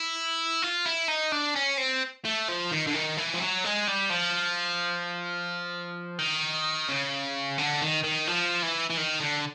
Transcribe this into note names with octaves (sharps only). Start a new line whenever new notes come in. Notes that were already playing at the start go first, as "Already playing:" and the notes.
Already playing: E4
F4
E4
D#4
D4
C#4
C4
A3
F3
D#3
D3
D#3
E3
F3
F#3
G#3
G3
F3
D#3
C#3
D3
D#3
D#3
F3
E3
E3
D#3
D3